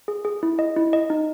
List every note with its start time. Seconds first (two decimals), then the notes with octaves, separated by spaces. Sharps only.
0.08 G#4
0.25 G#4
0.43 E4
0.59 D#5
0.77 E4
0.93 D#5
1.10 D#4